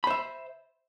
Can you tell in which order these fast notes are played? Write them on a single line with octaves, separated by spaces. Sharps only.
B5 C5 E5